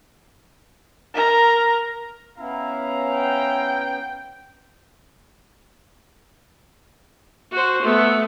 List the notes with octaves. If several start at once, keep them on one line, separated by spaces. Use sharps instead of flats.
A#4 A#5
B3 C#4 E4 F5 A#5
G5
F#4 C5
A3 B3